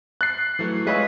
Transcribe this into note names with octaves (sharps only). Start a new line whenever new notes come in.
F#6 A6 C7
E3 F#3 A3
G#3 F4 B4 C#5 D#5 E5